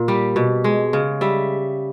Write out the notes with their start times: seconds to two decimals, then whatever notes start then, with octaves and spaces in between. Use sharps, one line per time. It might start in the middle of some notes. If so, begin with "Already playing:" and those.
Already playing: A#2
0.08 G3 G4
0.36 B2
0.64 G#3
0.93 C#3
1.21 G3 E5